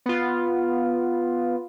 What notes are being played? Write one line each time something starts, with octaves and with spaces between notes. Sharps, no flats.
B3 F4